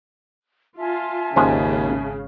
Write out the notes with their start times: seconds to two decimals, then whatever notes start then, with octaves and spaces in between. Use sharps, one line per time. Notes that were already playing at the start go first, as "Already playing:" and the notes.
0.78 F4 E5 G#5 A5
1.36 G#1 D#2 C#3 F3 G#3 C#4